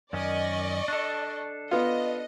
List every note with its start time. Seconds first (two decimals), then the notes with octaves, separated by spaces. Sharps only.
0.13 F#2 D#3 C#4 D5 D#5 C#6
0.88 D4 A4
1.71 B3 F4 D#5